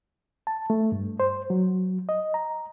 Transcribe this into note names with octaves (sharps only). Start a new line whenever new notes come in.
A5
A3
G2
C5
F#3
D#5
A#5